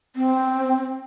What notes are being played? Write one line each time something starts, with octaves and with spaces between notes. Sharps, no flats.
C4